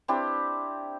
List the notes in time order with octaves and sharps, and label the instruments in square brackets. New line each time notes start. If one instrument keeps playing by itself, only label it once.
[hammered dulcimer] C4 D4 E4 G4